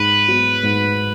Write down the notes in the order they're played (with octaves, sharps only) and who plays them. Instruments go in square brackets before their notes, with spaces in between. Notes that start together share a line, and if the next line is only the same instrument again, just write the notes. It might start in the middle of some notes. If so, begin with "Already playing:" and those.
Already playing: [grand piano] G#2 [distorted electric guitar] B4
[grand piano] F#3 B3 F#4
G#2